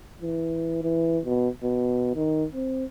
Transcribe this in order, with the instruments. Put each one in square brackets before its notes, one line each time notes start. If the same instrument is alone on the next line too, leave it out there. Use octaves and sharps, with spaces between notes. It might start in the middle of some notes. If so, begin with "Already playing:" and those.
[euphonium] E3
E3
B2
B2
D#3
C4